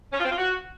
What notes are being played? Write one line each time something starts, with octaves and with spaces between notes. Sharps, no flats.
C#4
F4
C4
F4
F#4